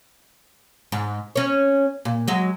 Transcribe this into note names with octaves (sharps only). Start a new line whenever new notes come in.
G#2
C#4 C#5
A#2
F#3 G#3